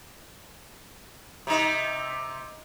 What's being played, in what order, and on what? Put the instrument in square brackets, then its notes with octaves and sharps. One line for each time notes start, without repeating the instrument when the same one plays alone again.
[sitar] C3 D#4